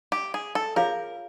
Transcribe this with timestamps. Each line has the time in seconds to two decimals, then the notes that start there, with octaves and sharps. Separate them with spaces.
0.12 G4
0.34 G#4
0.55 A4
0.76 F4 G#4 A#4 C#5 F5